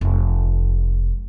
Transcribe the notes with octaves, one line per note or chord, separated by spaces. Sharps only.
F1 G#3